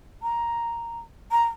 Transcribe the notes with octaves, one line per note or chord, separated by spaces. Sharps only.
A#5
A#5